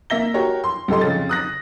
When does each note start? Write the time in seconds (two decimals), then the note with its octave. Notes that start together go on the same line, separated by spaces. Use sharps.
0.10 A#3 E5 A#6 G7
0.34 F#4 G4 A#4 C#5 G5
0.64 C6
0.88 C#2 G4 A4 D#5 C6
1.01 F2 C#3 A6
1.29 D#6 F#6 A#6